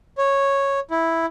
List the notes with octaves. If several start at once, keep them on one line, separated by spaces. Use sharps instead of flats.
C#5
E4